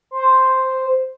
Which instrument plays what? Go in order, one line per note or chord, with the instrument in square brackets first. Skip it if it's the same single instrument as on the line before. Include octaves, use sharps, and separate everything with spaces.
[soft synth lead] C5